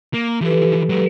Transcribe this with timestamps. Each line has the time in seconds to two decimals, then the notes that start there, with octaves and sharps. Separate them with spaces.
0.14 A#3
0.42 E3 F3 G4 A4 B4
0.90 F#3 G#3